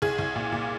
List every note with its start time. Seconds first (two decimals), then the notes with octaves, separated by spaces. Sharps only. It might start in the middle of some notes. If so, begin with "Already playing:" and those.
0.02 C2 G#4
0.19 C2
0.36 A#2
0.52 A#2